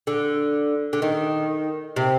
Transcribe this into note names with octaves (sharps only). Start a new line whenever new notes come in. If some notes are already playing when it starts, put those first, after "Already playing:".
D3
D3
D#3
C3